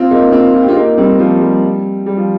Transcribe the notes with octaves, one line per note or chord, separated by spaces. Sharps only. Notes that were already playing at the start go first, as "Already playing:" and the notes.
Already playing: C4 F4
A#3 D#4
C4 F4
F4
G4
C4 F4
A#3 D#4
G3 C4
F3 A#3
G3
G3
F3